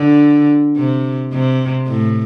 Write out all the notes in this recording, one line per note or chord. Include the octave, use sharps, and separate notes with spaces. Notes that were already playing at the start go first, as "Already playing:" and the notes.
Already playing: D3
C3
C3
A2